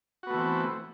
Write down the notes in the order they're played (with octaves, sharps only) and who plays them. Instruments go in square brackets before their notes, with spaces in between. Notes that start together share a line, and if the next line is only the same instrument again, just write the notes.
[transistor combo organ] F#4
B3
A3
E3
C4